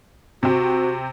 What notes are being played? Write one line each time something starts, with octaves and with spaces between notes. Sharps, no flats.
C3 C4 F#4